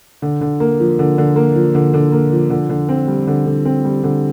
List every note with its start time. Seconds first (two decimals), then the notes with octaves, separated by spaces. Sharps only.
0.22 D3
0.41 D3
0.60 A#3
0.80 F3
0.99 D3
1.18 D3
1.36 A#3
1.55 F3
1.75 D3
1.94 D3
2.12 A#3
2.32 F3
2.50 D3
2.69 D3
2.89 C4
3.08 G3
3.27 D3
3.46 D3
3.65 C4
3.85 G3
4.04 D3